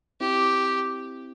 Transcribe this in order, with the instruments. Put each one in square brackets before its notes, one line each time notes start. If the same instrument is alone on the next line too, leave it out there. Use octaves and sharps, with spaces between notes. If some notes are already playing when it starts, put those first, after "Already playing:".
[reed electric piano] C4 E4 [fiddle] G4